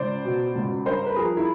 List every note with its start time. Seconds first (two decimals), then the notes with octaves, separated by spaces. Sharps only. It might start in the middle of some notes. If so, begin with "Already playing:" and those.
Already playing: C#2 C5 D5
0.25 B2
0.56 C#2
0.85 G2 A#4 C5
1.07 B4
1.16 F3 G#4 A#4
1.37 E4